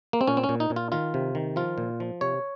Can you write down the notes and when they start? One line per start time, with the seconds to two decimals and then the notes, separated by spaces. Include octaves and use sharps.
0.13 A#3
0.21 C4
0.28 A#2 C#4
0.37 C4
0.44 C#4
0.49 A#2
0.60 D#4
0.70 A#2
0.76 F4
0.92 D#3 F4
1.14 C3
1.35 D#3
1.56 F3 F4
1.78 A#2
2.00 F3
2.21 C3 C#5